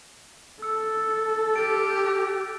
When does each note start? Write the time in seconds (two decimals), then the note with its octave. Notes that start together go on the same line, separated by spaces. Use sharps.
0.62 A4 E6 C#7
1.56 G4 F6 A6 D7